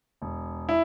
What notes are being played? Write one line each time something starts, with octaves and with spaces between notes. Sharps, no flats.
E1
E4